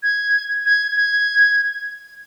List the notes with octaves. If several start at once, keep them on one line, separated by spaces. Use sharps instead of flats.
G#6
G#6
G#6